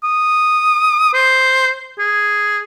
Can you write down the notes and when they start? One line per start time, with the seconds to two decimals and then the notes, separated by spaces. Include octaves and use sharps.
0.04 D#6
1.13 C5
1.99 G#4